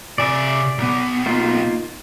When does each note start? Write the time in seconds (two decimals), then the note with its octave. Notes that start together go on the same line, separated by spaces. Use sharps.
0.18 C3 D5 E5 G#5
0.78 B1 B3
1.26 A#3 D#4 F4